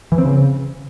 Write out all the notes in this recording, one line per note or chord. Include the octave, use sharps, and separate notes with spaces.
E3
C4
C#3